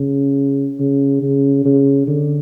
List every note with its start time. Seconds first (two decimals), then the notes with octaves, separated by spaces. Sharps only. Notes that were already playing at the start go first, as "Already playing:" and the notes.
Already playing: C#3
0.79 C#3
1.22 C#3
1.65 C#3
2.08 D3